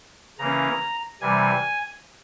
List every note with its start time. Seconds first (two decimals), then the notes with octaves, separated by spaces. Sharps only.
0.39 C#3 E3 A#3 C#4 A#5
1.21 C3 E3 G3 G#5